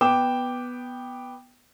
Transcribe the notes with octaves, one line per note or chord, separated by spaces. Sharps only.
B3 G5 D6 E7